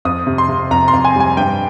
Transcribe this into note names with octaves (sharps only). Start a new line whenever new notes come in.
F2 D#6
C3
C6
C3
F2 A#5
C6
F2
G#5
G3 G#5
G2 G5